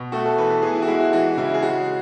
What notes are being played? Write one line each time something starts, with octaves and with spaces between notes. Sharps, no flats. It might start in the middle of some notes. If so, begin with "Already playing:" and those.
Already playing: B2
A3 F#4
A4
E3 B4
A4
B3 G#4
E4
F#4
G#3 E4
F#4
E3 F#4
C#3 E4
G#4
G#3 F#4